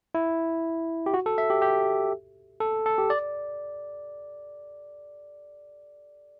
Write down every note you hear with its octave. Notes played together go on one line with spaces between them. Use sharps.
E4
G4
F#4
A4
E5
G4
G4
A4
A4
G4
D5